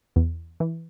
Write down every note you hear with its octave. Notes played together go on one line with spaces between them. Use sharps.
E2
E3